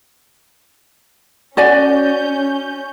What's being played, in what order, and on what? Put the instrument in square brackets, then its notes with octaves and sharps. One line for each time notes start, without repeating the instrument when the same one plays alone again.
[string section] C#4 G6 [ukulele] F#4 D5 G#5